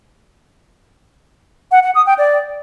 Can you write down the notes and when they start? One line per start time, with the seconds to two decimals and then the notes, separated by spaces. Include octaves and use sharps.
1.72 F#5
1.83 F#5
1.95 D#6
2.06 G5
2.18 D5